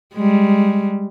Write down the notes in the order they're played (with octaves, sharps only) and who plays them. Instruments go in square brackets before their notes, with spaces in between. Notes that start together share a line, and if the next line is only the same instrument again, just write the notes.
[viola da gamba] G3 G#3